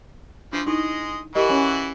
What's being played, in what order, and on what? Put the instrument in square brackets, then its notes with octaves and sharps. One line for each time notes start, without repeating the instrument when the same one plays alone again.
[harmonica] E3 F3 [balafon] D4
[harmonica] G#3 D#5 [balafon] D#4 E4
[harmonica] E3 E4 F#4 [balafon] G4 A#4 D#5
[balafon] C#4 C#5 G#5